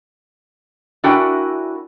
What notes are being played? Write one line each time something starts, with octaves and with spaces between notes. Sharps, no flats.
D4 E4 F#4 A#4 G5 G#5